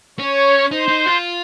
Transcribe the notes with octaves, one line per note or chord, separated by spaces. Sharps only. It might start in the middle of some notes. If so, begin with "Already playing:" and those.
C#4 C#5
D#4 C5
D#4
F4